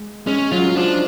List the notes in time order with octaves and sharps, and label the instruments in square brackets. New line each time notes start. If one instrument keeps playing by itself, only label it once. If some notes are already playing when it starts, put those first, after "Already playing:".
Already playing: [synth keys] G#3
[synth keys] G#3 [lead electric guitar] C#4
[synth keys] F#3 [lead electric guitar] F4
[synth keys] F3 [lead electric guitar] D4